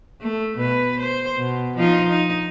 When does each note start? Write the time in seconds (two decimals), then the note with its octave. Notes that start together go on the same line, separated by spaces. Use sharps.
0.21 A3
0.57 B2 B4
1.00 C5
1.37 B2
1.77 F3 D#4 F4
2.09 D#4